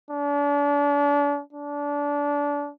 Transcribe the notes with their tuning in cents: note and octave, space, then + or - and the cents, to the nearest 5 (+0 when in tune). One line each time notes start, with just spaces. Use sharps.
D4 -35
D4 -25